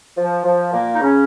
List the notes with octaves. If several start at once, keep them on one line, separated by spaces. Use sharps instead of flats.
F3
F3
A#2 A#3
D#4
C#3 C#4